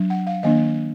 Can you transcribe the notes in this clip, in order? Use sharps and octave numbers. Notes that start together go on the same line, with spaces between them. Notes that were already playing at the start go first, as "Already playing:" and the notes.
Already playing: F#3 D4
F#5
F5
D#3 A#3 D4 D#5